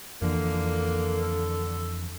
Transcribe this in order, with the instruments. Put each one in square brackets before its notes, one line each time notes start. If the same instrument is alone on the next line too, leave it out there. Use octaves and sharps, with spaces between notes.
[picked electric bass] F2 E3 [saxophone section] D3 [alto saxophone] A#3
[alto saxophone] A4